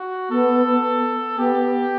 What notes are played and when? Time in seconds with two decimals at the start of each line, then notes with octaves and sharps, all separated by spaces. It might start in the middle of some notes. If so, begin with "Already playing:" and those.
Already playing: F#4
0.30 B3 A4
1.38 B3 G4